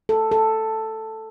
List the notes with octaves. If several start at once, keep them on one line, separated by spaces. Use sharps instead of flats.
A4
A4